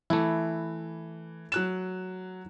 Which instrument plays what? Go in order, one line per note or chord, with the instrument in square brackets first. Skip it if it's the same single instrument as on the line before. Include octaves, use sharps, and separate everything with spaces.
[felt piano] E3 [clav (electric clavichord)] A3 E4
[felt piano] F#3 F#6 E7